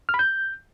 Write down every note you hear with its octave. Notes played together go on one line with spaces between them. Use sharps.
F6
B5
G6